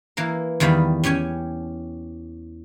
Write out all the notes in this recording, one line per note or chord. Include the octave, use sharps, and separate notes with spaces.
E3 A#3 A#4
E2 D#3 G3 F5 B5
C#4 G4 C#5 G#5